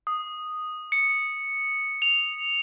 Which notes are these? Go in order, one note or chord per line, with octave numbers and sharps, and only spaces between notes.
D#6
C#7
F7